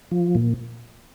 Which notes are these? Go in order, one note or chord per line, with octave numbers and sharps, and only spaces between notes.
F3
A#2